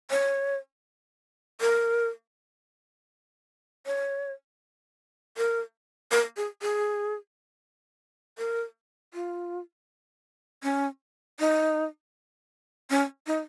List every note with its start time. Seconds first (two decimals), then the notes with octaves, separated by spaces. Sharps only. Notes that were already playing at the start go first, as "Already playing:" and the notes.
0.10 C#5
1.61 A#4
3.86 C#5
5.38 A#4
6.12 A#4
6.37 G#4
6.62 G#4
8.38 A#4
9.14 F4
10.63 C#4
11.40 D#4
12.90 C#4
13.27 D#4